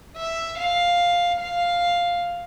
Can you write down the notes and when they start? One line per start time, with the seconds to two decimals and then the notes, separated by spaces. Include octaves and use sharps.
0.17 E5
0.58 F5
1.40 F5